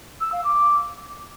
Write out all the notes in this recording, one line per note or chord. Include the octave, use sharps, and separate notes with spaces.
E6
F5
D6